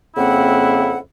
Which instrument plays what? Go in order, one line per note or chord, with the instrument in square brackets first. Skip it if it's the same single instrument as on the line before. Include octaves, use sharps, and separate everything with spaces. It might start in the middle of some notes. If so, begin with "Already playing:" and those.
[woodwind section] F2 C#3 A#3 C4 E4 F#5